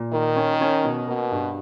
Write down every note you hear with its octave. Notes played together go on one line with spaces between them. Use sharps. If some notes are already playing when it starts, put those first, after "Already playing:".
Already playing: A#2
D#3 A#3
C#4
C#4
B2
B2 A#3
G2